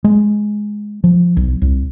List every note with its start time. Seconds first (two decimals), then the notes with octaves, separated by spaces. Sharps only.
0.04 G#3
1.04 F3
1.37 B1
1.62 C2